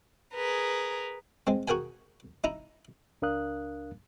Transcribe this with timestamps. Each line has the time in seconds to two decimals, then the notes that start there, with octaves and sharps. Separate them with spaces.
0.33 G#4 A#4 B4
1.47 G#3 C4
1.68 F#4 G#4 A#4 G5 G#5
2.44 D#4 E4 A#5
3.22 C#2 D4 A#4 F5 D#6 F#6